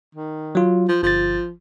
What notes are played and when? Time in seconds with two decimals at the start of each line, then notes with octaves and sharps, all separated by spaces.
0.15 D#3
0.55 F#3 F4
0.89 F3
1.03 G1 F3 A6